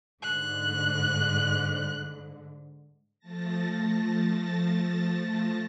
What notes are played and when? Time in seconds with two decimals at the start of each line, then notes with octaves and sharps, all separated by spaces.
0.23 G#2 D3 F#6
3.19 F3 A3 A5 A6 A#6